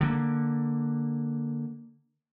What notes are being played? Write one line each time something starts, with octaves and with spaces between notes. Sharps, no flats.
D3 A#3